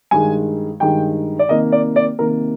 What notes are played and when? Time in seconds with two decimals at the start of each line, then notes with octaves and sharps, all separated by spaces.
0.11 G2 D#3 G#3 G#5
0.80 G2 D#3 G#3 G5
1.39 D5
1.49 C3 D#3 A#3 D#5
1.72 D5
1.96 D5
2.19 C3 D#3 A#3 A#4